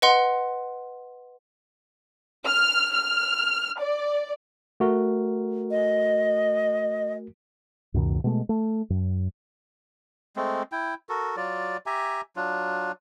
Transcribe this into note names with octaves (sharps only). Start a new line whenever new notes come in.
B4 D#5 F#5 C6
F6
F6
D5
A3 F#4 A#4
D#5
C#2 F#2 B2 D#3
B2 G#3 A3
A3
F#2
G#3 A3 C4
E4 G5
F#4 A4 A#4
F#3 F4 D5
G4 E5 G#5 A#5
F#3 D4 F4